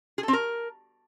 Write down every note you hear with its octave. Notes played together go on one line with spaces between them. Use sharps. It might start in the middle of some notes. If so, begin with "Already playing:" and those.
G#4
A4
C4
A#4